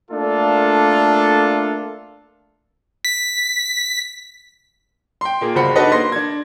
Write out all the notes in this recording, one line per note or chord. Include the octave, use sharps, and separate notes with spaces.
A3 A#3 D4 F4 A4
B6
G5 C6
A#2 A#3 G#4
G1 C#2 F#4 C5 B5 C#7
D4 D#4 F#4 A4 B4 D#5
A#3 C6 A#6
D4 G#6